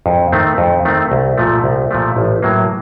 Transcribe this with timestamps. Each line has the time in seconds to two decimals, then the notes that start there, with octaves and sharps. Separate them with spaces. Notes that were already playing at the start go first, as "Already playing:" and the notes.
0.06 F2
0.32 D#3 A3 C4
0.58 F2
0.85 D#3 A3 C4
1.12 C2
1.38 A#2 F3 A3
1.64 C2
1.91 A#2 F3 A3
2.17 A1
2.43 A2 F#3 A#3